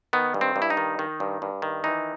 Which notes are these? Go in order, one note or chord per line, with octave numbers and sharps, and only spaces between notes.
D#3 B3
G2
C4
G2
E4
D#4
D#3
D#3
G2
G2
D#3
E3 D#4